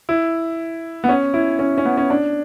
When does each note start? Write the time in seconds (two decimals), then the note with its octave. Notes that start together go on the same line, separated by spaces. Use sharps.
0.09 E4
1.04 B3
1.09 C#4
1.34 E4
1.59 C#4
1.78 C#4
1.85 B3
1.97 C#4
2.10 D4